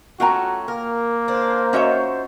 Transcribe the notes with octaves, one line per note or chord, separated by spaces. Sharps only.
A3 C#4 F4 F#4 G5 A#5
A#3 A#4
D4 C5
C#4 D#4 F4 F#4 C#5 E5